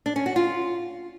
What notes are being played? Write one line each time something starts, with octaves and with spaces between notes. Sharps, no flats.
D4
C#4
F#4
F4